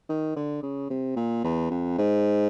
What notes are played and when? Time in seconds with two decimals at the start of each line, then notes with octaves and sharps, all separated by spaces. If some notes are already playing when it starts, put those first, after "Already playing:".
0.09 D#3
0.36 D3
0.63 C#3
0.90 C3
1.17 A#2
1.44 E2
1.70 F2
1.98 G#2